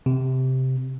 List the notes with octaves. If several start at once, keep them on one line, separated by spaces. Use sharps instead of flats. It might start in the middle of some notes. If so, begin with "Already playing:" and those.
C3